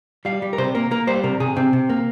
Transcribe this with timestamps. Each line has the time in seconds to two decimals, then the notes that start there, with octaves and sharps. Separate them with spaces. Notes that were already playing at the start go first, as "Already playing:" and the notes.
0.25 G3 F5
0.42 G3
0.53 A#4
0.58 C3 C5
0.75 A#3 A#4
0.91 A#3 A#4
1.07 G3 C5
1.24 C3 A#4
1.40 C3 G#4
1.56 C3 C4
1.73 C3
1.89 A#3